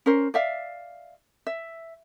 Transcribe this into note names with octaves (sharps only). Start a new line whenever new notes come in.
C#4 A#4 C5
D5 E5 F5
E5